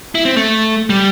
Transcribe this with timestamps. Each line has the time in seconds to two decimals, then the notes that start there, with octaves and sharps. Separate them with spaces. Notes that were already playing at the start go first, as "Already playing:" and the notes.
0.15 E4
0.25 C4
0.36 A3
0.90 G3